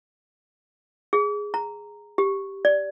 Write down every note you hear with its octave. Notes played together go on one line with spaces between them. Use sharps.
G#4
A#5
G4
D5